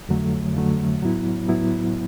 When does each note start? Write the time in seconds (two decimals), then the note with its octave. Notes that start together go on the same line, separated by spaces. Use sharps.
0.09 F2 D3 F#3 A3
0.55 F2 D3 F#3 A3
1.01 A2 F#3 B3 E4
1.48 A2 F#3 B3 E4